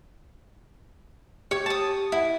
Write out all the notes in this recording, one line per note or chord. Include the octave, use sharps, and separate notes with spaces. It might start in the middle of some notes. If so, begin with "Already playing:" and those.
G4 C#5
A5 D#6
E4 F#5